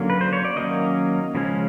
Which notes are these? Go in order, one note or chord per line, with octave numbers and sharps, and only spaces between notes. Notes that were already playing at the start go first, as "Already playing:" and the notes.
Already playing: D3 F#3 A#3 C#4
B4
C5
C#5
D5
D#3 F#3 A#3 C#4 D#5
C#3 F3 G#3 C#4